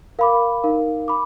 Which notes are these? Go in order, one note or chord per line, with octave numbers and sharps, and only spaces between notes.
A#4 F5 B5 D6
D#4 A#4 F5
B5 D6